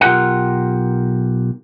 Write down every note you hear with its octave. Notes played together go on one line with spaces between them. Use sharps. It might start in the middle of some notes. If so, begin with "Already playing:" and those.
B1 F4 G4 A#4 F#5